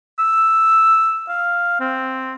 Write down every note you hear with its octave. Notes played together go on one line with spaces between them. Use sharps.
E6
F5
C4